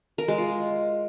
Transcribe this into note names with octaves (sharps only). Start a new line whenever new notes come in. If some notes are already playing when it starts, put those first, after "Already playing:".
A#4
G#3
F4